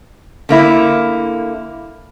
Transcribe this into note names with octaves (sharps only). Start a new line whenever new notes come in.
D3 A#3 E4